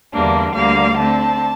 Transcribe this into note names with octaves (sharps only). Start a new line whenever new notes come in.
E2 D3 G3 A#3 D4
D2 D3 G3 A#3 F5
D3 A3 C4 A5